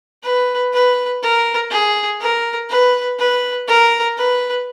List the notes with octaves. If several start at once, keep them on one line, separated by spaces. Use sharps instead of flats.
B4
B4
A#4
G#4
A#4
B4
B4
A#4
B4